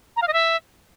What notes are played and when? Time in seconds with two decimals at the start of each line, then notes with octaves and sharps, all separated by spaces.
0.16 A#5
0.22 F5
0.28 D#5
0.33 E5